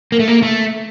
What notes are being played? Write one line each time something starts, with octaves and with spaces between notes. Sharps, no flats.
A#3
A3
A#3
A3